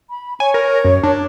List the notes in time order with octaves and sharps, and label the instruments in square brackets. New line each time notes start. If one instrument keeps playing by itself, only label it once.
[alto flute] B5
[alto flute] C#5 [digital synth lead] G#5
[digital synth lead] A#4
F#2
D4